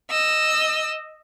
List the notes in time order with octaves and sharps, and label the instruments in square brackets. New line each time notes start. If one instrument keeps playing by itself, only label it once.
[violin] D#5 E6